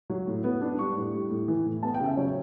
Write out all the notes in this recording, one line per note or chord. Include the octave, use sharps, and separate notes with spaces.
F#3
A2
B3
D4
G3 C#6
A2
G3
A2
E3
A2
B3 A5
G5
C#3
E5
F#3 C#5